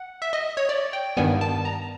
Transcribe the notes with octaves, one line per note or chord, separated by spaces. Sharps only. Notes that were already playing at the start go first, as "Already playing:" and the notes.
Already playing: F#5
E5
D#5
C#5
D5
G5
G2 D#3 G3 B3 G#5
A5
A#5